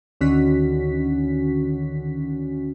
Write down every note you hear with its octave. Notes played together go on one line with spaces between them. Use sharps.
D2 D3 D#3 C#4 F#4 B6